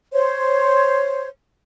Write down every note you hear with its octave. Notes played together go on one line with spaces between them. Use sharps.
C5 C#5